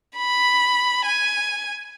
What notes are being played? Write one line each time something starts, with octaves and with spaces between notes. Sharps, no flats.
B5
G#5